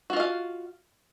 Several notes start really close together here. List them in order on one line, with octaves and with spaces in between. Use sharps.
F#4 F4 D#5 F5